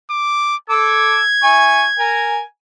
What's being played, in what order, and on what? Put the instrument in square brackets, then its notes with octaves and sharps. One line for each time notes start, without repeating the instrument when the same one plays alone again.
[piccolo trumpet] D6
[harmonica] A4 D6 E6 [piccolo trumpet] G#6
[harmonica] E4 G#5 C#6
A#4 G#5